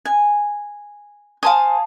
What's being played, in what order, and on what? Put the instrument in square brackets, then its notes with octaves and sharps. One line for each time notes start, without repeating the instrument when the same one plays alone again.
[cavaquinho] G#5
[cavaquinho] C5 G#5 [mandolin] F5 A5 D#6